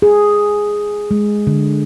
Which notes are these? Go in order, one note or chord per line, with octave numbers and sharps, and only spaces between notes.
G#4
G#3
D3